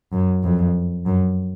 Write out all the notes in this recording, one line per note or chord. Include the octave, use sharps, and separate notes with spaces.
F#2
F2
F#2